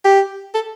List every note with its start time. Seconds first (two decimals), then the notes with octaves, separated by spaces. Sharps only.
0.05 G4
0.55 A4